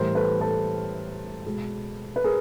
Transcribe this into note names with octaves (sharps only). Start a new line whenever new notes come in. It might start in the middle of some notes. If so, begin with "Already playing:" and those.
Already playing: A2 E3 G3 A#4 C5
A4 B4
A4 B4
B2 G#3
B4
G#4 A#4